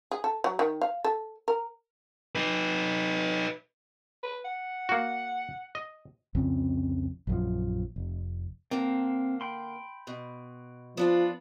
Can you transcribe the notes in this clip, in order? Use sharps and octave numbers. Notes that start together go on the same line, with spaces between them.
G#4
A4
F#3
D#3
F5
A4
A#4
D#4 B4
B4
F#5
A#3 F#4
D#5
C2 F2 C#3 C4
A#1 F#2 F3
F1
D3 A#3 C4
G5 B5 C6
B2
F3 B3 D4 F4